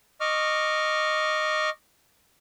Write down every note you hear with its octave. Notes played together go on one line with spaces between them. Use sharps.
D#5 C#6 D6 F6